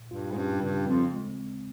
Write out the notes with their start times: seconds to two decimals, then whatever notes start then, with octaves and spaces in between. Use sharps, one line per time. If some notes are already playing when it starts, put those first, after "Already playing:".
Already playing: A#2
0.10 G2 F4
0.31 G#2
0.36 G2 C#4
0.62 G2 C#3
0.87 F2 C4
1.13 G#3